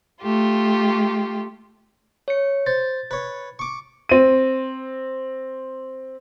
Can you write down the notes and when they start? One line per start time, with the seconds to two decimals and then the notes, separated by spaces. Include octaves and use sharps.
0.21 A3 F4 G4
2.28 C#5 C#7
2.66 C5 A6
3.11 B4 C#5
3.59 C#6 D6
4.09 C4 D#7